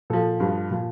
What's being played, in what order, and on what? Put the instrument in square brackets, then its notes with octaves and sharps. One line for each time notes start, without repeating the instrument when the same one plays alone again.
[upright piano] A#2 F3 A4
G2 F3
A#2 F3